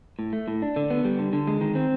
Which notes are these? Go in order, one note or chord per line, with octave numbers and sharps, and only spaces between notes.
A2
A3
A2
D4
D3
B3
G3
D3
D3
G#3
D#3
C4